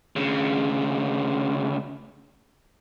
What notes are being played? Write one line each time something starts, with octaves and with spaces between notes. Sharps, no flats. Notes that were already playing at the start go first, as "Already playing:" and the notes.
D2 C#3